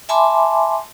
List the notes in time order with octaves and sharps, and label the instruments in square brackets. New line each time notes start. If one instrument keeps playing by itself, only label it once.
[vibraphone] E5 G#5 A5 B5 C6 D6